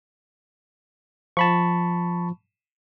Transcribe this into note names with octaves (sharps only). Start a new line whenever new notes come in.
F3 A5 B5 C#6